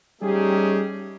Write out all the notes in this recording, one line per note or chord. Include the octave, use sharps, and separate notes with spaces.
G3 A3 C#4 D#4 G4 G#4